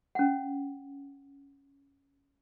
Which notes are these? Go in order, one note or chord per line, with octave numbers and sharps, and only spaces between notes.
C#4 F#5